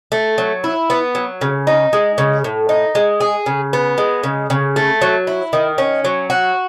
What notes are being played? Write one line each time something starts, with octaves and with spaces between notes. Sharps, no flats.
A3
F#3
E4
B3
F#3
C#3
D#4
G#3
C#3
A2
D#4
G#3
G#4
C#3
B3
G#3
C#3
C#3
A3
F#3
E4
D#3
C#4
F#3
F#4